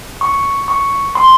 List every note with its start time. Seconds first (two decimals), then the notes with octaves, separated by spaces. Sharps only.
0.21 C#6
0.68 C#6
1.15 C6